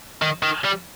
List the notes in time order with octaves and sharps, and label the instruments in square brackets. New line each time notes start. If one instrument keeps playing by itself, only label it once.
[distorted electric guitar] D#3
D#3
G3